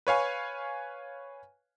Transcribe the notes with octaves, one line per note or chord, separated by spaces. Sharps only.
B4 C#5 F5 G#5 C#6